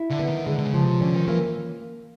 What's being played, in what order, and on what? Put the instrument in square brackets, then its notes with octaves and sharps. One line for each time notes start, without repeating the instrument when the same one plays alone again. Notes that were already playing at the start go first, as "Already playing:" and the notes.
Already playing: [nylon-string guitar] E4
[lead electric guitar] D3
[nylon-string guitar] B3
[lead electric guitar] D#3
[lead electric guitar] D3 [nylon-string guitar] G#3
[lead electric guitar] D3
C#3
[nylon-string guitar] F3
[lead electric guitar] C3
[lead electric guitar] D3 [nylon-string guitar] C#4
[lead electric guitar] D#3
[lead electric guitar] E3 [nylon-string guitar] A#3